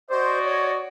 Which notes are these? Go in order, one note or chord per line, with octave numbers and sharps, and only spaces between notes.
F#4 C5 D5 D#5
C#5